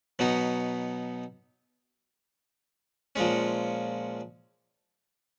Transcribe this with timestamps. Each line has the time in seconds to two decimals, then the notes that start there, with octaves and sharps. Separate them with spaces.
0.19 B2 F#3 B3 D#4
3.16 A#2 F3 G#3 C#4